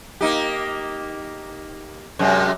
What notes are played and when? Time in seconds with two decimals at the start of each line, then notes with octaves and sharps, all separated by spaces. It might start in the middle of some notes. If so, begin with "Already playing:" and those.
0.21 A#3 D#4 G4
2.19 F#2 C3 G#3